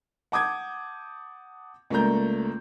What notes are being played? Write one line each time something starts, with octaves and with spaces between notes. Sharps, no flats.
F#5 A5 D6 D#6 G6 G#6
C#2 A3 A#3 D5 A#5 G6